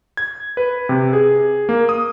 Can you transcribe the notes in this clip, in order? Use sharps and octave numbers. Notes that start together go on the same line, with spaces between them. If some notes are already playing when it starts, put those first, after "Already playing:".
G#6
B4
C3
G#4
A#3
D#6